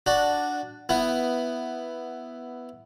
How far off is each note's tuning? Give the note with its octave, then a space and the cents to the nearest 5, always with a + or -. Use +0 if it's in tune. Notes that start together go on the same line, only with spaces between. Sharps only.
D4 +0 F#4 +0
B3 +5 E4 +0